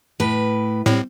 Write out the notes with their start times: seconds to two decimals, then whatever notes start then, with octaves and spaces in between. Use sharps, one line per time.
0.20 A2 B4
0.86 A2 G3 C4